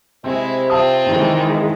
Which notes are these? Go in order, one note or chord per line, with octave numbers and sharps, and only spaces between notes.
C3 G#3 C4 E4
C4 F4 E5 A5 D#6
D#3 E3 G#3